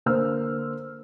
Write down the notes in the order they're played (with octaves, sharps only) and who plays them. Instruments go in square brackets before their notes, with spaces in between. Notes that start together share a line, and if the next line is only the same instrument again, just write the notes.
[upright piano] D3 A#3 C5 E6 F6